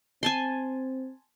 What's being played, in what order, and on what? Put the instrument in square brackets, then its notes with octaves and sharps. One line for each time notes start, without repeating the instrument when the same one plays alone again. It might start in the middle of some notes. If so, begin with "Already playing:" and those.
[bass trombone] C4 [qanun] G#5 A5 C6